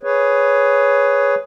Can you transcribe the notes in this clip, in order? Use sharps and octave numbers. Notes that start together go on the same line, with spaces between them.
G#4 B4 C#5